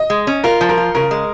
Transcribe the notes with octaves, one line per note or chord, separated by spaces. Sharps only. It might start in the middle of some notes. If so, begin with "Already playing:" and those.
Already playing: D#5
G#3
C#4
F4 A#4
F3
A#4
F4
C#3 A#4
G#3